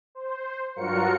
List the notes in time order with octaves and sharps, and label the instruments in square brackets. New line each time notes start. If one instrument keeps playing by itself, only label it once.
[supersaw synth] C5
G2 F#3 F4 F#4 A#4 C#7